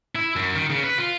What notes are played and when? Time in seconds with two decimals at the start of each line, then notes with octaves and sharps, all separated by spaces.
0.15 E4
0.36 F#2
0.56 D#3
0.70 C#3
0.84 B4
0.98 F4